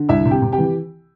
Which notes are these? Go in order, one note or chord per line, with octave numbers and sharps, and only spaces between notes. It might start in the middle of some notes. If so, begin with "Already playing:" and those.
Already playing: D3
C2 E4 E5
C3
G4 G5
C3
G4 G5
E3